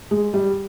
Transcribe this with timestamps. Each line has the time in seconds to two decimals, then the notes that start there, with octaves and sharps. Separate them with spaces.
0.11 G#3
0.34 G3